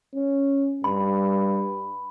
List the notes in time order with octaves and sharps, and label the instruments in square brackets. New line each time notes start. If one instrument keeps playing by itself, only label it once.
[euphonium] C#4
[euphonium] G2 [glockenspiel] B5